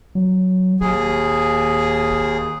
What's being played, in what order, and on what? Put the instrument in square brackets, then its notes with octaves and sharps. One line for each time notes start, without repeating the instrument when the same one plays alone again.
[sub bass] F#3
[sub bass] D#1 [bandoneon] D#2 G#4